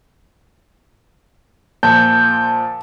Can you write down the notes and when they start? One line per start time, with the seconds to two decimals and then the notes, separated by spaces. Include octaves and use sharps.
1.83 A#2 F3 A5 G6